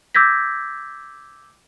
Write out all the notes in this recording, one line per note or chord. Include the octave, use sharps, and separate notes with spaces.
D6 E6 G6 G#6 A#6 B6